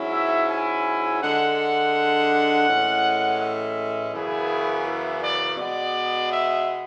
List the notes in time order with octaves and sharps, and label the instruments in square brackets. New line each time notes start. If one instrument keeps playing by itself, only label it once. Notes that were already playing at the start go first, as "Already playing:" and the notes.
Already playing: [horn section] G#2 F#3 C#4 E4
E5
G#5
D3 G#3 D4 F#5
A2 E3 G#3 C#4
E5
F#2 C#3 E3 B3 E4 G#4
E4
D5
B2 G#3 B3 D5
E5